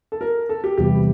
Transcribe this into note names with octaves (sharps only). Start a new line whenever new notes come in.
A4
A#4
A4
G4
E2 C3 E3 G3 B3 G4